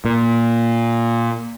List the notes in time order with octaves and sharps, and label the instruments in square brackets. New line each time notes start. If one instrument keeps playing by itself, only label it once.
[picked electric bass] A#2